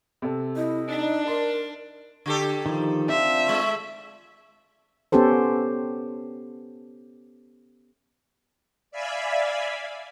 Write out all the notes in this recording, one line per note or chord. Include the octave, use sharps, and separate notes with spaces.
C3 A4
E4 D#5
D4 D#4
A#4 C6
D3 G4 A4
D#3 F3
C4 D4 F4 E5
G#3 A3
B3 C#4 G4 A4 C5
D5 E5 F5 G#5 B5